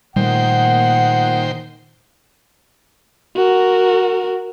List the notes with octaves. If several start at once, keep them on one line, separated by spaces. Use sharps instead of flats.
A#2 D#3 G3 A3 C5 F#5 G5
F#4 A#4